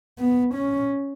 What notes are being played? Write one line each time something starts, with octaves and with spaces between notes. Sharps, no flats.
B3
C#4